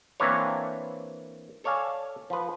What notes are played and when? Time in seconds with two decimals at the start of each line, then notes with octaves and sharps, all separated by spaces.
0.20 E3 A#3 C4 D4 B4 C#5
1.64 A4 C#5 D5 F5 G#5 A5
2.30 F3 B4